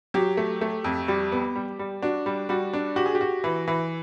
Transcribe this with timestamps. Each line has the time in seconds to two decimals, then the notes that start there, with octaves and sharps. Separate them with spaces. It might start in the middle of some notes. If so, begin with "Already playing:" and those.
0.14 F#3 G4
0.37 A3
0.61 A3
0.84 F2
1.08 G3 G4
1.32 B3
1.56 G3
1.79 G3
2.02 D4 F#4
2.26 G3
2.49 G3 F#4
2.73 D4
2.96 F#4 G4
3.06 G#4
3.15 G4
3.21 F#4
3.44 E3
3.68 E3